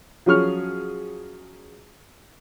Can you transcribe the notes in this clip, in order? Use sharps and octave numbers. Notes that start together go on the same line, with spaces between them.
F3 F#3 C#4 G#4 C#6 F6